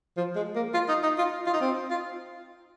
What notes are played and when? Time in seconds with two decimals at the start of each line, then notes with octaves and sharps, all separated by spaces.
0.17 F3
0.36 G#3
0.55 A#3
0.74 F4
0.89 D#4
1.03 D#4
1.18 F4
1.47 F4
1.54 D#4
1.61 C4
1.91 F4